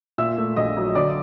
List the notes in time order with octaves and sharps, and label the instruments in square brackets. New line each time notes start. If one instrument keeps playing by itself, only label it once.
[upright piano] A#2 E5 E6
A3
A#1 D#5 D#6
F#3
D3 D5 D6